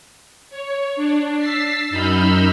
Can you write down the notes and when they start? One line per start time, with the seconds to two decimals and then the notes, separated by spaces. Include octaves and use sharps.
0.50 C#5
0.96 D4
1.38 E6 A6 B6 C7
1.90 F#2 D#4 B5 E6 F6 G6